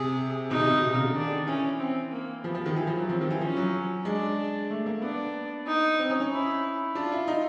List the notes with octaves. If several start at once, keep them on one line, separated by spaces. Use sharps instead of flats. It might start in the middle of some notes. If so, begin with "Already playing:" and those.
Already playing: C3 G#4
B2 D#4
C3
B2
C3
C#3
D3
D#3 D4
E3 C#4
C4
A#3
F3 B3
F3
D#3
E3
F3
F#3
F3 C4
D#3
E3
F3 C#4
F#3
G#3 D4
A3
A#3
B3 D4
D#4
C4
C#4
C#4
E4
D4 F4
E4
D#4